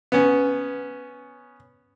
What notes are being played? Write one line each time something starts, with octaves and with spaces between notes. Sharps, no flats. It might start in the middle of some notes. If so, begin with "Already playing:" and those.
B3 C#4